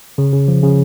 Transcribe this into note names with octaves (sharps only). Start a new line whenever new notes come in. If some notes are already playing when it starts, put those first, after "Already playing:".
C#3
C#3
F3
C#3